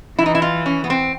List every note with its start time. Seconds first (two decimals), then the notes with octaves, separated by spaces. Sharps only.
0.19 E3 E4
0.26 D#4
0.35 E4
0.42 F4
0.66 C#4
0.84 B3
0.90 C4